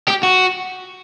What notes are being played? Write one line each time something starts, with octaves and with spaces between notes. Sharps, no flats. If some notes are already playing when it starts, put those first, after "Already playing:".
G4
F#4